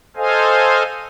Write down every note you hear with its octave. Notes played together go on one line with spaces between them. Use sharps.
A4 C5 D#5 F5 G#5